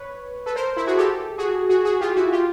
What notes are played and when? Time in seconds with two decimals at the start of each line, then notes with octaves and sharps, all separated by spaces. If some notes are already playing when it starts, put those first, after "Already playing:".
Already playing: B4 C#5
0.46 A4 B4
0.56 A#4 C5
0.77 E4
0.87 F#4 G#4
0.97 G4 A4
1.38 F#4 G#4
1.69 F#4 G#4
1.84 F#4 G#4
2.01 F4 G4
2.16 E4 F#4
2.32 F4 G4